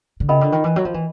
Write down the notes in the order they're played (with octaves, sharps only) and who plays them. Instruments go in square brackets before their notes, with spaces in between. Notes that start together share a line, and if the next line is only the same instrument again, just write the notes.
[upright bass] D3
[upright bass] C#3 [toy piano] F4 A#4 D#5 G5 B5
[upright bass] D3
D#3
E3
F#3
F3
E3